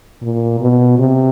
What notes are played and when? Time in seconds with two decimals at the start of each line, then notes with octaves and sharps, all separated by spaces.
0.22 A#2
0.60 B2
0.99 C3